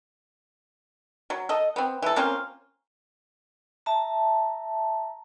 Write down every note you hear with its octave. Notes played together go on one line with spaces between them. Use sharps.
F#3
A4 D#5
B3 C4
E3 A4
A#3 C4 C#4 F4
E5 A5 A#5